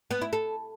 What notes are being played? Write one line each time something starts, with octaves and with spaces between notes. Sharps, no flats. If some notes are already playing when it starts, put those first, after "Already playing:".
B3
E4
A4